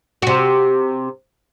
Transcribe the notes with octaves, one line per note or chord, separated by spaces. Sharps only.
C3 F#4